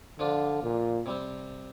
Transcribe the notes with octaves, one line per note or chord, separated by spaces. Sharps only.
D3 F3 D4 F4
A#2
C3 G3 C4